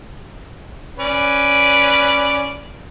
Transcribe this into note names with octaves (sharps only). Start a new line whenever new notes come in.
C#4 B4 D5